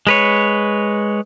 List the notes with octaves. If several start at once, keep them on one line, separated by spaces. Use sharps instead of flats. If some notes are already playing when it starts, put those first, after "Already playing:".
G#3 B4 C#5